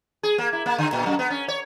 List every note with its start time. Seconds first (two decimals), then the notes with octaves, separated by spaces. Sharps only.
0.23 G#4
0.38 A#3
0.53 E4
0.66 A#3
0.78 D3
0.93 A#2
1.06 F#2
1.19 B3
1.30 C#4
1.48 C#5